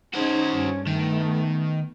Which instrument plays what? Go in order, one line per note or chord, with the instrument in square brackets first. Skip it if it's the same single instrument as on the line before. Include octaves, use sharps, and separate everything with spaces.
[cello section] C#4 D#4 G#4 [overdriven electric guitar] F#4 C5
[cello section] G2 C#4
[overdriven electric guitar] D#3 [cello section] A3 B3